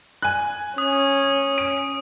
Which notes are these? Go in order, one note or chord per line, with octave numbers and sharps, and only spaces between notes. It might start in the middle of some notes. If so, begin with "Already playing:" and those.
G#5 F#6
C#4 D#6
D7